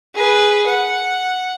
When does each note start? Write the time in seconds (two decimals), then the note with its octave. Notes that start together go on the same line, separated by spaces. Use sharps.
0.14 G#4 B4
0.66 F#5